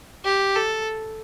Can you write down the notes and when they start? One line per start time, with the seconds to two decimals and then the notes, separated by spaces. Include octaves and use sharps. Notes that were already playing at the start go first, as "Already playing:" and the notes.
0.25 G4
0.56 A4